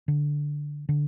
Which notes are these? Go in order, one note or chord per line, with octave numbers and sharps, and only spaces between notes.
D3
D3